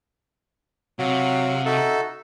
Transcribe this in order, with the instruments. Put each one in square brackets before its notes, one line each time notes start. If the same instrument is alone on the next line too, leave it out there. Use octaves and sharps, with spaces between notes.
[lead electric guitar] C3 [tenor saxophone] F#3 [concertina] F5 F#5
[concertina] D#4 F#4 E5 [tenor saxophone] A4